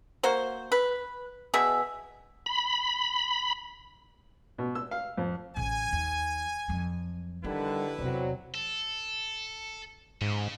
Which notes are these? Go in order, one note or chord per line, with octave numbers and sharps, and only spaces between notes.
A#3 F#4 C5
B4
B2 G#4 E5
B5
B2
E6
F5
F2
A1 C#3 G#5
D#2
F2 F#3
D3 D#3 G3 E4 G4 B4
E2 C3 F#3 C4 D5
A4
G#2 C#3